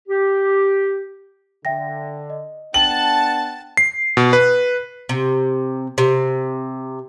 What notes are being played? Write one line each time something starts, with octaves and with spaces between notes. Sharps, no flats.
G4
D3 E5 G5 A#6
D#5
B3 D4 F#5 G5 A5 F#7
C7
B2
B4
C3
C3